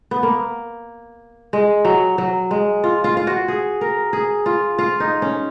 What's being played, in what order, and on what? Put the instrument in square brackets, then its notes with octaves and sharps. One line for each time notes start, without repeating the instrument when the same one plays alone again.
[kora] B3
A#3
G#3
F#3
F#3
G#3
F4
F4
F4
F#4
G#4
A#4
G#4
F4
F4
D#4
C#4